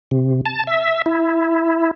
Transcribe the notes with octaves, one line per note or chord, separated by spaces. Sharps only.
C3
A5
E5
E4